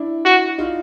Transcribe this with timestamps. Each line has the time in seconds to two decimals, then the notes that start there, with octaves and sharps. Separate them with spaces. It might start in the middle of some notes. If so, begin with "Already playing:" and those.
Already playing: D4 E4
0.25 F#4
0.58 D#4 F4